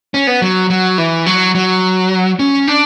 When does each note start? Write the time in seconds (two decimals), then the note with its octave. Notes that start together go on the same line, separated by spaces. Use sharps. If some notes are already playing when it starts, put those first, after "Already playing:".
0.14 C#4
0.27 B3
0.42 F#3
0.70 F#3
0.98 E3
1.26 F#3
1.55 F#3
2.39 C#4
2.68 D4